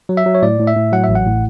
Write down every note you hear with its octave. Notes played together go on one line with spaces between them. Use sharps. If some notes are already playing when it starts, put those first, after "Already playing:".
F#3
E5
F#3
C#5
A2 D5
A2
E5
A2
F#3 F#5
A1 E5
F#5
A2